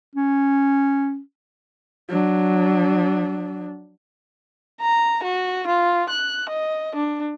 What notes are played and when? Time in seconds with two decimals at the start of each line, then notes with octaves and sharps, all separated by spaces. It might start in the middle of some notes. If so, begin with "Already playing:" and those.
0.16 C#4
2.09 F#3 D4
4.81 A#5
5.24 F#4
5.67 F4
6.09 F#6
6.50 D#5
6.95 D4